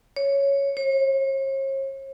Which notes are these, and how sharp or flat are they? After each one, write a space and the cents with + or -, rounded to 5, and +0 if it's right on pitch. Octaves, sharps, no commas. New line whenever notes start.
C#5 +0
C#5 -45